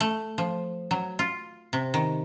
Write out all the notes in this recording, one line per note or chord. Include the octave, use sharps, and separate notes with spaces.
A3
F3
F#3
F4
C3
D#3